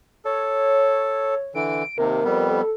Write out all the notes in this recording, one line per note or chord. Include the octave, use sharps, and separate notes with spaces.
A4 C#5
D3 E3 D7
D#2 C3 A#4
F2 G3 B3
A4